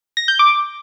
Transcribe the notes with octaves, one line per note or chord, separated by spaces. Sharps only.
A#6
G6
D6